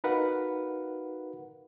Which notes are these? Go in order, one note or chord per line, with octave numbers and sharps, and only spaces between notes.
D#4 F#4 A#4 B4 F5 F#5